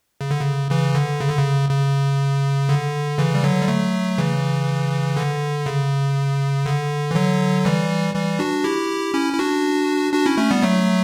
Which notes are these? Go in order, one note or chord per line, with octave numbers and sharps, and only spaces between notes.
C#3
D3
C#3
C#3 E3
D3
C#3
D3
C#3
C#3
D3
C#3 E3
G3
D3 F#3
G3
F#3 A3
C#3 E3
D3
C#3
D3
E3
D3 F#3
E3 G3
E3 G3
D4 F#4
E4 G4
C#4 E4
E4
D4 F#4
D4 F#4
C#4 E4
A3 C#4
G3 B3
F#3 A3